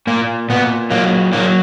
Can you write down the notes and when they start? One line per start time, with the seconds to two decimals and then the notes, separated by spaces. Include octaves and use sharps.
0.07 A#2 A#3
0.50 A#2 B3
0.90 F#3 A#3
1.33 F#3 A#3